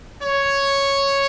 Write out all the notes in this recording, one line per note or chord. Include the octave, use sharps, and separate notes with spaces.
C#5